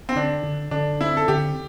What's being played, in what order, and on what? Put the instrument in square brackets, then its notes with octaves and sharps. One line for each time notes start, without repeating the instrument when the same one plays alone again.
[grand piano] C4
[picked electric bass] D3 [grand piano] D4
[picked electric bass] D3
[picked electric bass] D3 [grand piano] D4
[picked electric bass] C4 [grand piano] E4
[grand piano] A4
[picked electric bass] D3 [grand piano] G4